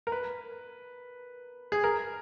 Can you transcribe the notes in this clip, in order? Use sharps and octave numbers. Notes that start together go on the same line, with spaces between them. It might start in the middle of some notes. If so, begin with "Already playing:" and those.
A#4
B4
G#4
A#4